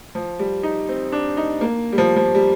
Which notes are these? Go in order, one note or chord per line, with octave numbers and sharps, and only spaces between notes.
F3
G3
D#4
C4
D4
D#4
A#3
G3
F3
F3
G3